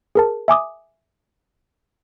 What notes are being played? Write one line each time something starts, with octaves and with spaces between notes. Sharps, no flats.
G#4 A#4 A5
E5 G#5 D6 D#6